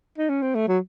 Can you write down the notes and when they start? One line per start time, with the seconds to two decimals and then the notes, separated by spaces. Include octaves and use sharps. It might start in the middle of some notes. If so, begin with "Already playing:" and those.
0.18 D#4
0.30 C#4
0.42 C4
0.55 A3
0.68 F#3